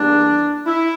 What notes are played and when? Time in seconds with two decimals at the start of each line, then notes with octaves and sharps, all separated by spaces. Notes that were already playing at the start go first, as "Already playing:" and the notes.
Already playing: E2 E3 G3 A#3 D4
0.67 E4